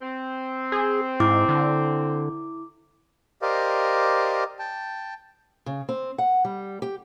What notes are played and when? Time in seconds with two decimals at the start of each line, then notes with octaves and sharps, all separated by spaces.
0.02 C4
0.72 G#4
1.20 G#2 E4 D6
1.49 D3
3.42 G4 A#4 C5 D5 D#5 F5
4.59 G5 A5
5.66 C#3
5.89 C4
6.18 F#5
6.45 G3
6.82 G4